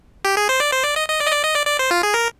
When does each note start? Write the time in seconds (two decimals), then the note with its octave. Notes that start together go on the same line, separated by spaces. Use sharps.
0.25 G4
0.37 G#4
0.49 C5
0.60 D5
0.72 C5
0.84 D5
0.96 D#5
1.09 D#5
1.20 D5
1.27 D#5
1.32 D5
1.44 D#5
1.55 D5
1.67 D5
1.79 C5
1.91 F4
2.03 G#4
2.14 A#4